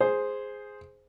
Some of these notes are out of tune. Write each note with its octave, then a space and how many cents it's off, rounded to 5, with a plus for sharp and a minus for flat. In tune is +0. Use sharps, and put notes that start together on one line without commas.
G#4 +0 C5 +0